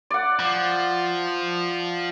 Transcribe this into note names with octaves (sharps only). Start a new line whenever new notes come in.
D5 F#5
F3